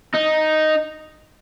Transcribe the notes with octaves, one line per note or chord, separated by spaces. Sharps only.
D#4